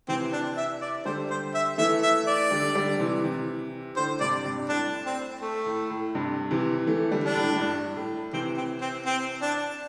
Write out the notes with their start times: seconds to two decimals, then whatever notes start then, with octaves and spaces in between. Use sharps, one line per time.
0.08 C3 E3 C4
0.33 D4
0.57 E5
0.81 D5
1.05 D3 G3 C5
1.30 C5
1.54 E5
1.78 E3 A3 E5
2.03 E5
2.27 D5
2.51 D3 G3
2.75 D3 G3
2.99 C3 E3
3.24 C3 E3
3.96 A2 D3 C5
4.21 G2 C3 D5
4.45 G2 C3
4.59 G2
4.69 A2 D4
5.06 C4
5.41 A3
5.66 A2
5.90 A2
6.15 G2 C3
6.51 C3 E3
6.87 E3 A3
7.12 D3 G3
7.24 D4
7.35 A2
7.52 A2
7.60 G2
7.96 A2
8.33 C3 E3 C4
8.57 C4
8.81 C4
9.06 C4
9.42 D4